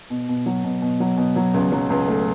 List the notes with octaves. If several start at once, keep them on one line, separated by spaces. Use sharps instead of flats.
B2
B2
F#3
B2
B2
F#3
B2
F#3
C#2
F#3
C#2
A3